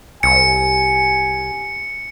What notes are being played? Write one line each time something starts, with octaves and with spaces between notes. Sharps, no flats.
C2 G#5 C#7